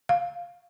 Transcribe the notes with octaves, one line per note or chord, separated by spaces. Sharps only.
F5